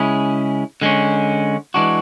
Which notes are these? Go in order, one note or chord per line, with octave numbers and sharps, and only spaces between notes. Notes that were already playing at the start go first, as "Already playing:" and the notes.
Already playing: C#3 G#3 C#4 E4 G#4
D3 G#3 C#4
E3 G#3 D4 F#4